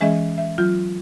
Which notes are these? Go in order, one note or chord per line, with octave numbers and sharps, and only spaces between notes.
E3 G#3 C#4 G#4 D#5 E5
E5
F#3 F4 G6